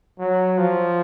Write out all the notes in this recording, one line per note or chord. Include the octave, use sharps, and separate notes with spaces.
F#3
F3